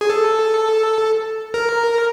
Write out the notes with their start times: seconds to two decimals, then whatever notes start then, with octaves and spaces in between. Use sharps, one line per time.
0.01 G#4
0.10 A4
1.54 A#4